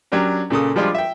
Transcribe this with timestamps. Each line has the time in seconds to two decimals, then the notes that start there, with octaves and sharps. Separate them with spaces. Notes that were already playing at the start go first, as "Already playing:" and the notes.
0.12 F#3 C#4 D4 G4 A#4
0.50 A#2 C#3 A4 D#6
0.76 F3 G3 G#3 D4 F4
0.95 E5 G5